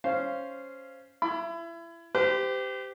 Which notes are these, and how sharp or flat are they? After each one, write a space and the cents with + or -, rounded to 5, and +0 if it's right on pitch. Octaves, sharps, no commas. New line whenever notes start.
C#4 +5 C5 +0 F5 -15
E4 +30 B5 +30
G4 +0 C5 -40